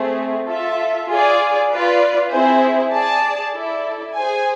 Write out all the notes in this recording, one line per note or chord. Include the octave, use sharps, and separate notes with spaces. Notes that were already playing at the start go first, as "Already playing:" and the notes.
Already playing: A3 C4 G#4
F4 A4 E5
F4 G#4 D5
F4 B4 D5
C4 E4 G#4 C5
G#4 D5 A5
E4 A4 D5
G#4 C5 G#5